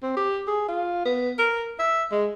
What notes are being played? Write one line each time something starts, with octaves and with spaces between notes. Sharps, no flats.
C4
G4
G#4
F4
B3
A#4
E5
G#3